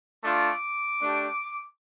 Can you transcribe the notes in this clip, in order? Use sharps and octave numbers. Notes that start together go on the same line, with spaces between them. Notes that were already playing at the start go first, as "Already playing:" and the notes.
A3 D4 F4 D6
A3 D4 G4